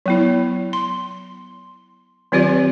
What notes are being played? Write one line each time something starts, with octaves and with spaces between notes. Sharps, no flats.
F#3 B3 E4
C6
D#3 F#3 C4 F4 G4 D5